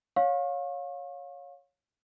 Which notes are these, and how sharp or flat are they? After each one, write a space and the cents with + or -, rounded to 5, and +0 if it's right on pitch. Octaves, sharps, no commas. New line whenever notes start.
C#5 +0 F5 +25 C#6 -35